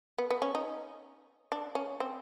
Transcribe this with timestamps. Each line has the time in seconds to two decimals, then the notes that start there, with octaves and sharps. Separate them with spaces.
0.18 B3
0.30 B3
0.42 C#4
0.55 D#4
1.52 D4
1.75 C#4
2.00 C4